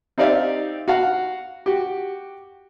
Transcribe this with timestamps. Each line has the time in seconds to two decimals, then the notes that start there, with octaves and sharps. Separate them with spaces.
0.18 C4 D#4 G4 D5 E5 F5
0.88 F#4 F5 F#5
1.66 F#4 G4